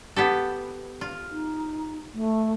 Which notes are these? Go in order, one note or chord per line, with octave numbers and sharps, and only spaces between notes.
B3 G4 A4
F4
D#4
A3